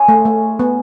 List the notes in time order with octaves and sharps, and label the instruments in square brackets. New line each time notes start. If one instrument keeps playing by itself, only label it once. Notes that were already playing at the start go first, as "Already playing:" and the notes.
Already playing: [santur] G#3 C#4 E4 G#4
[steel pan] A3
A3
B3